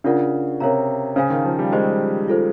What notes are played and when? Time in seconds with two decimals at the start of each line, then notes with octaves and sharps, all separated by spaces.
0.04 C#3 D4 F4 A#4 D5 F#5
0.60 C3 A#4 C#5 F5 A#5
1.16 C#3 C5 F5 G#5
1.30 D#3
1.45 F3
1.59 G3
1.72 G#3 G4 C5 D#5
2.28 F4 A4 C5